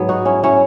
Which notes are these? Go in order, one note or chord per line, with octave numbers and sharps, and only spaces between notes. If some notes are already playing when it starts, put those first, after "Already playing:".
Already playing: G#2 F#3 B3
D#4 F#4
C#4 E4
C#4 E4